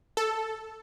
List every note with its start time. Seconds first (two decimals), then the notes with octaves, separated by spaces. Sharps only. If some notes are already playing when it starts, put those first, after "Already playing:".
0.17 A4